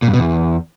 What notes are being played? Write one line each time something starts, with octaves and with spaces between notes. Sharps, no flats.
A#2
G2
B2
E2